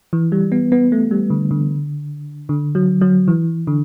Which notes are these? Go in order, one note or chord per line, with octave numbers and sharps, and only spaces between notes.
E3
G3
B3
B3
A3
G3
D3
D3
D3
F#3
F#3
E3
D3